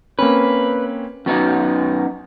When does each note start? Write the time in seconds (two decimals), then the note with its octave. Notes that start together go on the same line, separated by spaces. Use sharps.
0.19 A#3 C4 C#4 B4
1.26 F#2 B3 D#4 F#4